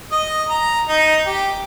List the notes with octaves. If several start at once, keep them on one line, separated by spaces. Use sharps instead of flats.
D#5
A#5
D#4
G4